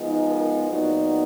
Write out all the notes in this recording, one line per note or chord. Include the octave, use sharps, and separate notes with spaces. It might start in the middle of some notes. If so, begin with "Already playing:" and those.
Already playing: F3 G#3 B3 D#4
A#4
A#2 F#3 B3 D#4